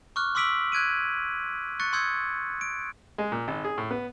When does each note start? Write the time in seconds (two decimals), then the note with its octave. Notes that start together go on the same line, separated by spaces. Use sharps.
0.16 C#6 D6 F6 F#6
0.35 C6 D6 E6 B6 D7 F#7
0.72 F#6 G#6 D7 D#7
1.80 C#6 F#6 A6 C#7
1.93 C6 D#6 E6 G6 G#6 C#7
2.61 D7
3.18 G#3
3.32 A#2
3.48 G#1
3.64 G#4
3.78 A2
3.91 B3